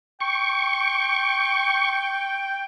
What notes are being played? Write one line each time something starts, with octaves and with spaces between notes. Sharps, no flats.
G5 C#6